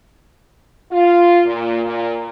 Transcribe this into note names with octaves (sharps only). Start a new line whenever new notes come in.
F4
A#2
A#2